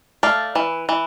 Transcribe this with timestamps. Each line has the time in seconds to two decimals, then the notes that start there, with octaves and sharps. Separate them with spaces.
0.23 A3 D5 F5
0.55 E3
0.89 E3